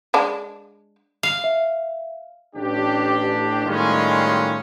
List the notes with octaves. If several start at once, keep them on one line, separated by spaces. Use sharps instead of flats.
G#3 D4
F5
E5
A1 D4 G4
A2 D#3 G3 G#3 C#4 F4